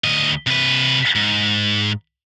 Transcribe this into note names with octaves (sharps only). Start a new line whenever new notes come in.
D2 D#5
C3 B4
G#2